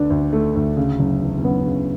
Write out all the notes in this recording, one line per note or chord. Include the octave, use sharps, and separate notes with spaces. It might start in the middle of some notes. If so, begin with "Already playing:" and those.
Already playing: D2 D3 D4 B4
D2
A3
D2
C#3
F#1
E2
C#4
F#1 B3
C#3